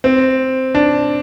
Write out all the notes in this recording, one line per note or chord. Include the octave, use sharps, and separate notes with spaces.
C4
D4